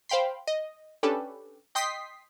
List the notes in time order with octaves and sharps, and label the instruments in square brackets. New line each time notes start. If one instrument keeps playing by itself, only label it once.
[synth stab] C5 F5 G5 B5 C6
D#5
C#4 D4 G4 A4 B4
D#5 G5 C6 D#6 B6 C7